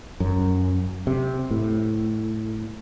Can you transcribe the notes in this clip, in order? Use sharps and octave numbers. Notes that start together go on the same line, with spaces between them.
F#2
C3
A2